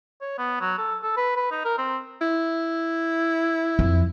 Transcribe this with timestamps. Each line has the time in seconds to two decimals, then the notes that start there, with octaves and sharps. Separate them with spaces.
0.21 C#5
0.38 B3
0.60 F#3
0.78 A4
1.03 A4
1.17 B4
1.37 B4
1.51 D#4
1.65 A#4
1.78 C4
2.21 E4
3.79 F2